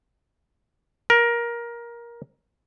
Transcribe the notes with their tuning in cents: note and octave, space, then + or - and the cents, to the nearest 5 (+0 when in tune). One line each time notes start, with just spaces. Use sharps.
A#4 +15